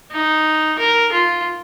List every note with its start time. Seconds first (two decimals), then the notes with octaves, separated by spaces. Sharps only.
0.12 D#4
0.79 A#4
1.13 F4